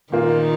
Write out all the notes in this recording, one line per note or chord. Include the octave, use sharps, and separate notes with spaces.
A#2 D#3 A#3 F4